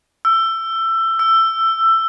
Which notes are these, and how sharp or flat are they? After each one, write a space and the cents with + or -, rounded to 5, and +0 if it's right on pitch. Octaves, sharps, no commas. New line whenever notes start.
E6 +20
E6 +15